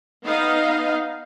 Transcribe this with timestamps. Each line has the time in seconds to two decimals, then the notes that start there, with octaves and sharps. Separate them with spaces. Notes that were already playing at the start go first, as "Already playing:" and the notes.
0.24 B3 D#4 F5